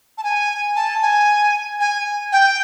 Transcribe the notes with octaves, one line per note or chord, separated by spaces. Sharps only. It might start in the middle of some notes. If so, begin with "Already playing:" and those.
A5
G#5
A5
G#5
G#5
G5